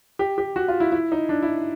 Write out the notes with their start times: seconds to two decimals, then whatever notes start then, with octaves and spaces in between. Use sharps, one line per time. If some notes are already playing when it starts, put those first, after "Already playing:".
0.19 G4
0.38 G4
0.56 F#4
0.68 F4
0.80 E4
0.92 E4
1.12 D#4
1.29 D4
1.42 E4